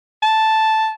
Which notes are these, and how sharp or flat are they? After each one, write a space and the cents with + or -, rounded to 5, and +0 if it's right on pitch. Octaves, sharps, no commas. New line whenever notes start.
A5 -5